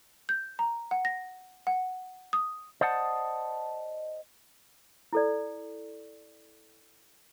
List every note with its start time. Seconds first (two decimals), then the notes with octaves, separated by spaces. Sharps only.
0.29 G6
0.59 A#5
0.91 F#5
1.05 A#6
1.67 F#5
2.33 D#6
2.81 C5 D5 D#5 F#5 A5
5.13 E4 A4 D5